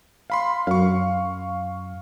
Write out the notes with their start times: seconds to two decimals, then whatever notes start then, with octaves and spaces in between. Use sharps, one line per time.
0.30 F5 B5 C6
0.67 F#2 F5 C#6